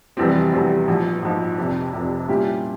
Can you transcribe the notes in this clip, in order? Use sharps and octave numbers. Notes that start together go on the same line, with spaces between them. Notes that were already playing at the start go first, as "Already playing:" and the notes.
F1 E2 E3 G3 C4
F1 E2 E3 G3 C4
A#1 G#2 F3
A#1 G#2 F3
F1 F2 C3
F1 F2 C3
A#2 G3 C#4 E4 G4